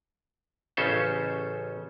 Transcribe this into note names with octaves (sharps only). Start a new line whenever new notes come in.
A1 C#3 C#4 A4 C5